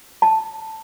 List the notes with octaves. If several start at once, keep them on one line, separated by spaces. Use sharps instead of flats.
A5